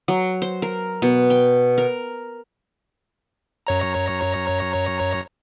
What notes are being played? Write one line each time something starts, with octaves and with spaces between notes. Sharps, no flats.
F#3
C5
A#4
B2
G5
A#4
F#2 C#5 A#5